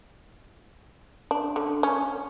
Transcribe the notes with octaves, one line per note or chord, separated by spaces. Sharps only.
D4
D3
C#4